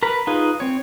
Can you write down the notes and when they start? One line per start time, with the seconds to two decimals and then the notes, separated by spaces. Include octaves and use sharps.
0.03 A#4 B4 B5
0.27 D#4 F4 G#4 B4
0.60 C4 C#5